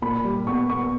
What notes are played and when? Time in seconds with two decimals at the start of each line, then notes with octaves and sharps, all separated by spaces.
0.02 A#2 B5
0.24 G3
0.47 B3 C#6
0.69 B3 C#6